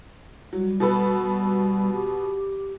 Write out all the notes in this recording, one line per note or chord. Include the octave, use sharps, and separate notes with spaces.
F#3 G3
B2 A4 B4
G3
G4